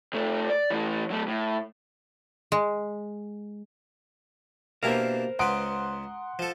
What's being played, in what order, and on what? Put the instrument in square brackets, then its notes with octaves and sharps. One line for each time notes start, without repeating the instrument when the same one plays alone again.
[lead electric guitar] C3 A3
D5
E3 A3
F#3 A3
A2
[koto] G#3
[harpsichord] B2 D4 E4 [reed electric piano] A#3 G4 F5 [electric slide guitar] A#4 C5
[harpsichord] C#2 B4 [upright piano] F#5 C6 D7 [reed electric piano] A#5 D#6
[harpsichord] F3 A4